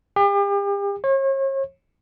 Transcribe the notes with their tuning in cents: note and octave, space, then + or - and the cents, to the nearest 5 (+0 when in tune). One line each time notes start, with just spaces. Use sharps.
G4 +40
C#5 -40